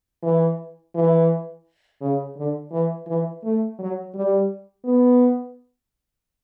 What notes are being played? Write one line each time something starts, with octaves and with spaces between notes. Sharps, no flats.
E3
E3
C#3
D3
E3
E3
A3
F#3
G3
B3